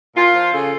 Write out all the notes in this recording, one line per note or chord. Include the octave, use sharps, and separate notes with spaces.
A#2 F4
F3
C#3 A4